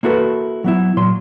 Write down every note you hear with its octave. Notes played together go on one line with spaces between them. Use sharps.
A#3 E4 F#4 A4 B4
F#3 B3 E4
A#2 F#3 C6